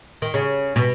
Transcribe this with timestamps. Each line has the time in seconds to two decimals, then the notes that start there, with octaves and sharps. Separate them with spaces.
0.22 D#3
0.34 C#3
0.76 B2